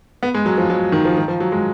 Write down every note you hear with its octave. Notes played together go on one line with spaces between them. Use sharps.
B3
G#3
F#3
F3
F#3
D#3
F3
D#3
F3
F#3
G#3